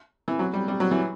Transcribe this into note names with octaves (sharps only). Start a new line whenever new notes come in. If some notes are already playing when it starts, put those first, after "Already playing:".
E3
F#3
G3
G3
F#3
E3